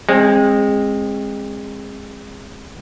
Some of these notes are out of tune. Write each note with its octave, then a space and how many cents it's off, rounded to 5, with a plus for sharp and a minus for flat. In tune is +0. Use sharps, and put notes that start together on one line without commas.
G#3 -20 C4 +25